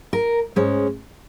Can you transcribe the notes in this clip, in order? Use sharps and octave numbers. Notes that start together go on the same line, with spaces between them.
A#4
G#2 G#3 C#4